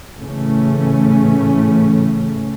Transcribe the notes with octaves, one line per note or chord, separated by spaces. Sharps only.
A2 C#3 E3 A3 C#4